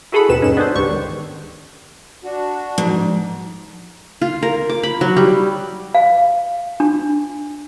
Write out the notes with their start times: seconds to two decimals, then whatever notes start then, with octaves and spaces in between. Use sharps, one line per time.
0.12 E4 F#4 G#4 A4 F#5 B5
0.29 D#2 B2 C4 B4 E7
0.41 G2 C#4 D#4 E7
0.57 B3 D4 F#4 G#4 A4 C5
0.75 C#2 G#2 D4 G4 C#6
0.89 D#3
2.24 D4 F#4
2.78 G#2 F3
4.21 F4
4.42 A#4
4.69 D6
4.83 B5
5.01 F#3
5.16 G3
5.95 F5
6.80 D4